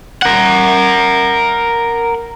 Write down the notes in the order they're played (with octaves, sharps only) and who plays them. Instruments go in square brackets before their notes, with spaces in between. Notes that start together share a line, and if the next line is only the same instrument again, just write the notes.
[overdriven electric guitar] A#4 F#5